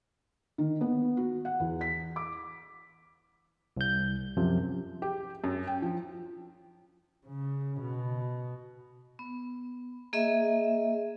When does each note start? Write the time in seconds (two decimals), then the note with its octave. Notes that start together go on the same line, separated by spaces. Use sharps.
0.58 D#3
0.81 B3
1.17 F#4
1.45 F#5
1.60 E2
1.81 B6
2.16 D6
3.77 C2 G6
4.37 F#2 C3 F3
5.02 G4
5.44 F#2
5.67 G5
5.82 F3
7.27 C#3
7.81 B2
9.19 B3
10.13 A#3 G#4 D#5 E5